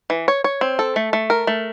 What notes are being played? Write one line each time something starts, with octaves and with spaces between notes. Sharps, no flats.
E3
C#5
C#5
C4
A4
A3
A3
A#4
A3